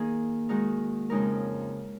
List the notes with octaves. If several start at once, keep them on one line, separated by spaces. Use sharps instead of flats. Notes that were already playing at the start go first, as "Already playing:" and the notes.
Already playing: D#3 A#3 D#4 G#4
D#3 G#3 D#4 F#4 A#4
F2 C#3 G#3 D#4 A#4